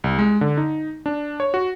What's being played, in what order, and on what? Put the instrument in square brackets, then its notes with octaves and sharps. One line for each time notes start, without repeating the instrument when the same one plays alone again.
[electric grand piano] C2
G#3
D3
D#4
D4
C#5
F#4